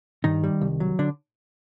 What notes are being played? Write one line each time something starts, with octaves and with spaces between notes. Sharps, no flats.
G2 D#3 D#4
G3
C2
F#3
D3 D4